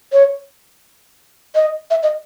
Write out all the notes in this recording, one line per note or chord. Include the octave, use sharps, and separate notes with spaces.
C#5
D#5
E5
D#5